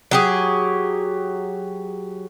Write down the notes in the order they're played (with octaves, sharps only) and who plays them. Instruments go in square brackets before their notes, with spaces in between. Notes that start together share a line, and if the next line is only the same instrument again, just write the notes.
[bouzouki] F#3 G4 G#4